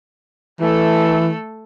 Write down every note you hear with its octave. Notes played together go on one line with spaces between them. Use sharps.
E3 A3 A4